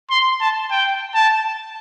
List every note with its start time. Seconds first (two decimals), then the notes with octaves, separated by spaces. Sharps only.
0.10 C6
0.40 A5
0.70 G5
1.14 A5